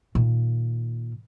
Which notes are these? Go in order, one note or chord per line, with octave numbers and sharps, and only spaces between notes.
A#2 D#3